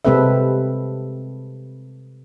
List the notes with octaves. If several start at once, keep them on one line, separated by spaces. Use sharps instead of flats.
C3 G#3 C4 A4 B4 E5